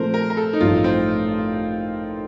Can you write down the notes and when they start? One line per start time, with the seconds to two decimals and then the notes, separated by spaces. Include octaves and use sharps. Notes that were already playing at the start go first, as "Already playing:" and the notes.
Already playing: A#2 F3 A3 C4 A#4 C5
0.14 A#4
0.30 A#4
0.37 A4
0.53 D#4
0.60 A1 G2 F3 A3 F4
0.84 C4